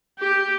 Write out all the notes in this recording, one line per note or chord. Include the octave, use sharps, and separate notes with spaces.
G4